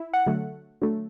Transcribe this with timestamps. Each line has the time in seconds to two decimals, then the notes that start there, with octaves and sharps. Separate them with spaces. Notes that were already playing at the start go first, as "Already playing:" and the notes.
Already playing: E4
0.13 F#5
0.26 D3 F#3 A3
0.82 D3 F#3 A3